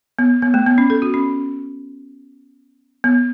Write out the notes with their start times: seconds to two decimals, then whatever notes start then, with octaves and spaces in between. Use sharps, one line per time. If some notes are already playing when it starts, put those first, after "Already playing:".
0.19 B3
0.42 B3
0.54 A3
0.66 B3
0.78 C#4
0.90 A4
1.02 F#4
1.14 C#4
3.04 B3